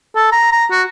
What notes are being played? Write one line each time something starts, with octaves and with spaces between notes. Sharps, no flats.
A4
A#5
A#5
F#4